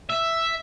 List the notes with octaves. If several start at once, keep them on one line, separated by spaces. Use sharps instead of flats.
E5